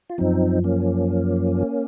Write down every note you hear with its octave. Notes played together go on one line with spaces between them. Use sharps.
F4
F#2 F3 C4 D#4
A#3 C#4